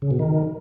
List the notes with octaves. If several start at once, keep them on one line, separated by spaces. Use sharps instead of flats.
C#3
B2
D#3